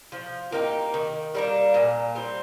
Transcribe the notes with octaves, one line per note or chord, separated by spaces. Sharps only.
F3
A#3 D#4 G4
D#3
G3 A#3 D4
A#2
G3 C4